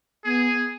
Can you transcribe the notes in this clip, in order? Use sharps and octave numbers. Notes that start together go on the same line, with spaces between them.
B3 G#4